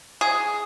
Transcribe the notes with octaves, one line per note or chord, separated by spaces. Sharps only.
G#4